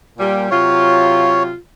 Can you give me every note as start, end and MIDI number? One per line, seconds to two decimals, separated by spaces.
0.19 0.48 46
0.19 0.48 55
0.50 1.53 48
0.50 1.53 54
0.50 1.53 65
0.50 1.43 73